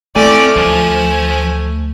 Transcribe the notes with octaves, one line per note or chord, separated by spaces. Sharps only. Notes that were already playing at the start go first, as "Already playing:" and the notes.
A3 C4 E4 D5 G#5
D2 F3 G#5